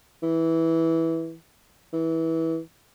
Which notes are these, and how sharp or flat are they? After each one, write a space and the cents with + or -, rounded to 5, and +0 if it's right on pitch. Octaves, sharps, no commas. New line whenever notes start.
E3 -10
E3 -20